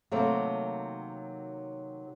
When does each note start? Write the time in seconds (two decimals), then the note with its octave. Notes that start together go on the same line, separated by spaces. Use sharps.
0.12 C3 D#3 F#3 A3 A#3